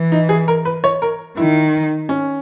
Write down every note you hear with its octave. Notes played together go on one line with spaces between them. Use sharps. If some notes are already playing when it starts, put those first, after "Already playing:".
Already playing: E3
D#4
G#4
A#4
B4
C#5
A#4
D#3 E4
C#4